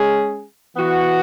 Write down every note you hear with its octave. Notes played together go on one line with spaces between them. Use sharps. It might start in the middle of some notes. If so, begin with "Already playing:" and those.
Already playing: G#3 C#4 G#4
E3 B3 F#4